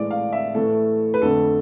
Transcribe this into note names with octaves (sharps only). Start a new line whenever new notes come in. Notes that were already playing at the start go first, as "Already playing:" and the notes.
Already playing: A2 E3 G#3 D5
F5
E5
A2 E3 A3 A4
B4
F2 D3 A3 A4